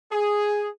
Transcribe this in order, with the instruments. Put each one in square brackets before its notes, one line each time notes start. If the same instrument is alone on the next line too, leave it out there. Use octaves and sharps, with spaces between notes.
[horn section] G#4